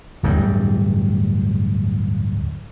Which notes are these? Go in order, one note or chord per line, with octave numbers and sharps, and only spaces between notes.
D1 E2 G2